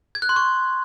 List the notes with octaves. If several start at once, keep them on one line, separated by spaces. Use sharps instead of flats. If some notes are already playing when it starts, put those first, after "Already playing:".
G#6
F#6
C6
C#6